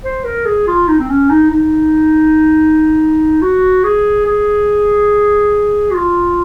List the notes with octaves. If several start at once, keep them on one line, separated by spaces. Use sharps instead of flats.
C5
A#4
G#4
F4
D#4
C4
C#4
D#4
D#4
F#4
G#4
G#4
F#4
F4